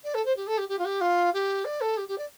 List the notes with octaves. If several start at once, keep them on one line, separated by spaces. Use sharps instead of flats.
D5
A4
C5
G4
A4
G4
G4
F4
G4
F4
G4
D5
A4
G4
G4
D5